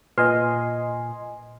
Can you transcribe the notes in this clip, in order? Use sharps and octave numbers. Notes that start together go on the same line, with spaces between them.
A#2 B4 D#5 G#5 C6